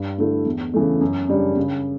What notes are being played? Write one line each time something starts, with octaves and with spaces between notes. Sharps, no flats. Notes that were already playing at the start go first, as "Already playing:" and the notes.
Already playing: G2
D3 A3 E4
E2
C#3 E3 A3
F#2
C#3 G3 D4
C#3